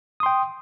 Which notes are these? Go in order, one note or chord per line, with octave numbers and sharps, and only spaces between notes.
G5 C6 D#6